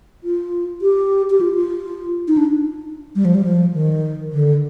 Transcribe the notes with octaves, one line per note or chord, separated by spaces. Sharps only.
F4
G4
G4
F4
F4
D#4
D4
G3
F3
G3
F3
D#3
D3